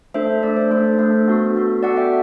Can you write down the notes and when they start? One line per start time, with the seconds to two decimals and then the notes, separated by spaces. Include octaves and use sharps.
0.14 A3 D4 A4 C5 E5
0.43 A3 D4 A4 D5
0.57 C5
0.71 A3 D4 A4 C5
0.99 A3 D4 A4
1.28 B3 F#4 A4
1.55 B3 F#4 A4
1.83 B3 F#4 A4 D5 F#5
1.97 E5 G5